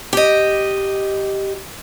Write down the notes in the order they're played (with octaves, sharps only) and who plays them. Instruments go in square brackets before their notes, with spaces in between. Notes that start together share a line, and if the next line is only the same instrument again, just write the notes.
[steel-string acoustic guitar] G4 D#5